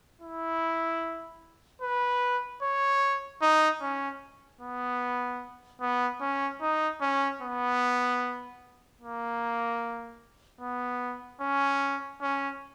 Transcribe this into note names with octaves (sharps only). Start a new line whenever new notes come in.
E4
B4
C#5
D#4
C#4
B3
B3
C#4
D#4
C#4
B3
A#3
B3
C#4
C#4